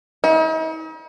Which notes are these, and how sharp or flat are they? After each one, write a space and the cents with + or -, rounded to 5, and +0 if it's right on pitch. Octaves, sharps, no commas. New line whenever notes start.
D#4 +45